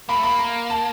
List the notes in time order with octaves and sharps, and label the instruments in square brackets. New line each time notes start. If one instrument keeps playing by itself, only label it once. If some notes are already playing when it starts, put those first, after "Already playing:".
[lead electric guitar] A#3 [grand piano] B5
[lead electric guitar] A3
[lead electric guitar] A#3 [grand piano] B5
[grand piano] A#5
A5